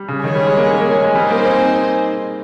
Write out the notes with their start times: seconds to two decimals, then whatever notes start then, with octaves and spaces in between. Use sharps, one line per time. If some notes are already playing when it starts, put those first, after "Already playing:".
Already playing: G3
0.08 C#3
0.23 D#3 G#4 C#5 G#5
0.35 G3
0.47 G#3
0.57 A#3
0.69 A#3
0.80 A#3
0.92 G#3
1.04 G#3
1.15 G3 D#4 G#4 C5
1.30 A#3
1.45 C4